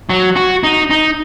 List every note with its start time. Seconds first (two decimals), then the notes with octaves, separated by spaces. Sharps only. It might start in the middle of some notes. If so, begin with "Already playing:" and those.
0.10 F#3
0.36 F#4
0.63 D#4
0.90 D#4